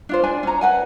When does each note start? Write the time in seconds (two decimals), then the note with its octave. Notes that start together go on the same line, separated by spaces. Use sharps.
0.09 D4 F4 C5
0.23 D4 D5 G#5
0.43 C#4 A#5
0.61 B4 F#5 G#5